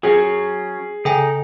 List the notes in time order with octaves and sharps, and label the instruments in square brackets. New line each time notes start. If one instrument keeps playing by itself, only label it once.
[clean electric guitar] F#3 C#4 [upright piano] G#4
[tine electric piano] C#3 [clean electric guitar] D#4 [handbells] A4 G5 G#5